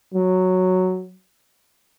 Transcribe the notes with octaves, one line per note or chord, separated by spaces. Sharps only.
F#3